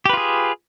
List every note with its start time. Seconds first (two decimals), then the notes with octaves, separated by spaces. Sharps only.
0.06 G4
0.09 B4
0.13 F4
0.17 G#4